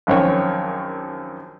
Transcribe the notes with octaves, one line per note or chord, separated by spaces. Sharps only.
A#1 F#2 D#3 C4 C#5